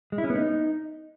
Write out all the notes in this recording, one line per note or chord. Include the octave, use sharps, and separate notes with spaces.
G#3
E4
C#4
B3
D#4